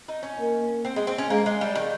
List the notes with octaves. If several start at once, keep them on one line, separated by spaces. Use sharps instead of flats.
D#4
C#4
A#3
C4
G#3
C4
C#4
G#3 A#3
G#3
G3
D#3